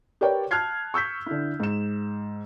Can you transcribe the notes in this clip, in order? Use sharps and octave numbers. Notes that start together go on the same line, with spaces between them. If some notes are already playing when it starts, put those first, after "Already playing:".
G4 A#4 B4 C#5 D5 G5
A5 F6 F#6 G#6 C7
C#6 E6 G6 B6
D3 E4
G#2 E7